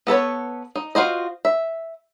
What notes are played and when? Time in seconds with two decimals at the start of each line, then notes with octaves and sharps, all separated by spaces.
0.07 B3 A4 B4 C#5
0.76 D#4
0.95 F4 F#4 C5 D#5
1.45 E5